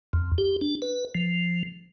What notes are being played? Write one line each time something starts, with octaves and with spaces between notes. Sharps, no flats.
F2
G4
D4
B4
F3